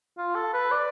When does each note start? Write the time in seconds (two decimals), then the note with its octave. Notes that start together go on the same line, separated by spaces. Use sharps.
0.18 F4
0.35 A4
0.54 B4
0.71 D5